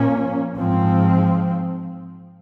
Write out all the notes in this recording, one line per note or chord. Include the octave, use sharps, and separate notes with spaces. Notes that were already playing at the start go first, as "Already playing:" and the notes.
Already playing: A#2 F3 A#3 C#4
G#2 F3 C4